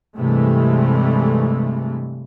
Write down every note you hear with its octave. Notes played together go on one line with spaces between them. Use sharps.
G2 C3 E3 G#3 A3